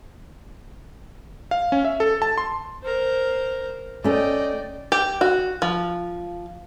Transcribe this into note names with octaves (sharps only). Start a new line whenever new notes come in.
F5
C#4
E5
A4
A5
C6
A#4 C5
A3 C#4 D5 D#5 G5
G4
F#4
F3